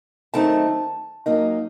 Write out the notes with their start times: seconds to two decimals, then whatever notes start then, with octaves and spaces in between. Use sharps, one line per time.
0.34 F#2 D#3 A3 C4 D#4 A5
1.26 F#2 F#3 A#3 D#4